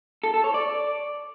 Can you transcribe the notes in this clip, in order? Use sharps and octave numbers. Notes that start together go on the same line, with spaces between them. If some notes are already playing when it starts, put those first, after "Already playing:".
A4
A4
C#5
D5